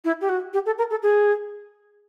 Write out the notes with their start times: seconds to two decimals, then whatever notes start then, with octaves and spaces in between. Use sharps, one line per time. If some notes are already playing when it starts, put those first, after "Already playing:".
0.05 E4
0.21 G4
0.29 F#4
0.54 G4
0.66 A4
0.78 A#4
0.90 A4
1.03 G#4